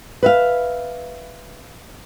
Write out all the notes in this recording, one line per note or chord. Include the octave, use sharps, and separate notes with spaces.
B4 E5 F5